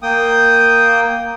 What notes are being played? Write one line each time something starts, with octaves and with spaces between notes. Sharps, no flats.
A#3 G5 D#6